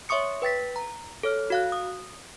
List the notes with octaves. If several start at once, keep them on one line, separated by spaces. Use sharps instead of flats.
C#5 E5 C6 C#6 D#6 C#7
B4 G5 A6 B6
A#5
A4 C#5 F6
F#4 F5 F#6
D#6